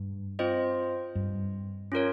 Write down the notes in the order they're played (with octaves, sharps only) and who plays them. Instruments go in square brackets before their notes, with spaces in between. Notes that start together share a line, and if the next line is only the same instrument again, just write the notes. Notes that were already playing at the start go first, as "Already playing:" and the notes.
Already playing: [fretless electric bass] G2
[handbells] C4 F4 C5 D#5
[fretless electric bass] G2
[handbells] C#4 F4 A#4 C#5